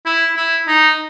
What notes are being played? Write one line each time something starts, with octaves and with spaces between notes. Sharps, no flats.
E4
E4
D#4